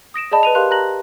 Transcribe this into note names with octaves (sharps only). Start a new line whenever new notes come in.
D#6 A#6 D7 E7
G#4 D5 D#5 A5 B5
B4 D#7 F7
G4 A#4 F5 C6 F#6 F7
G4 A5 A#5 F#6 A#6 F#7